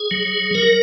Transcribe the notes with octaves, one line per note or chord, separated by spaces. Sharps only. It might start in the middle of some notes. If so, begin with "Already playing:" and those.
Already playing: G#4
F#3
F#3 A#4